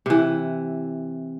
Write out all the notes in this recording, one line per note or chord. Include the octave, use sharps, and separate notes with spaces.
C3 E3